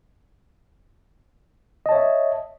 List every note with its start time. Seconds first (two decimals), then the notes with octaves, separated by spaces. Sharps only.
1.86 D#5
1.89 A5
1.92 C#5
1.95 E5